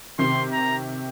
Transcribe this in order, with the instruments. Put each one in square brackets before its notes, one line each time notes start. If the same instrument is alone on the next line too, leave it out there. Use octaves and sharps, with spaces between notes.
[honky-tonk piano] C3 D#3 [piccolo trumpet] C6
[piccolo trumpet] A#5